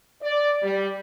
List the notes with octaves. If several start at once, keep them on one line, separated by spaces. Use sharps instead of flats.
D5
G3